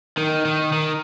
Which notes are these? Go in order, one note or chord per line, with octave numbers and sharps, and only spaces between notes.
D#3
D#3
D#3